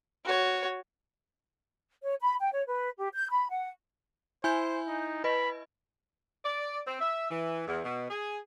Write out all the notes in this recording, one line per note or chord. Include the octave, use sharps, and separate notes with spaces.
F#4 C#5
C#5
B5
G5
C#5
B4
G4
G6
B5
F#5
E4 C5 G#5 G6
D#4
B4 D#5 B5
D5
C4
E5
E3
E2
B2
G#4